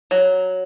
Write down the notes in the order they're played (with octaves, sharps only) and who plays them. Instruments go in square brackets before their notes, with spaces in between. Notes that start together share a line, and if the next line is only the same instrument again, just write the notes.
[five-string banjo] F#3